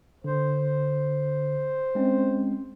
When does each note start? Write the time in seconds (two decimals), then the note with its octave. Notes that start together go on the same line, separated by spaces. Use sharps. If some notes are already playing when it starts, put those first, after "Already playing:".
0.24 D3 C5
1.95 G#3 C4 C#4